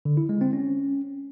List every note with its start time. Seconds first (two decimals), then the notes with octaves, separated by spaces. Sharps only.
0.05 D3
0.17 E4
0.29 G#3
0.41 C4
0.53 C#4